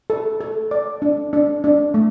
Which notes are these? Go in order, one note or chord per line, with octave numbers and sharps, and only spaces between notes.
A4
A4
D5
D4
D4
D4
A3